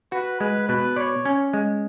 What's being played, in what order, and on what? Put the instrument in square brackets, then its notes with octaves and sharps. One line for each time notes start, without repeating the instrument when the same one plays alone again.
[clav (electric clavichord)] F#4 [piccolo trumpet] B4
[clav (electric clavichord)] G#3 [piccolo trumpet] B4
[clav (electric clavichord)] B2 [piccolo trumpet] B4
[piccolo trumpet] C#5 [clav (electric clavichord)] D5
[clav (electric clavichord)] C#4
G#3